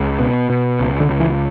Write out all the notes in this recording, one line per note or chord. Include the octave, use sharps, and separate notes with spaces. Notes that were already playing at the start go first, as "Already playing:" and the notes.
Already playing: C#2
B2
B2
C#2
D3
C#2
E3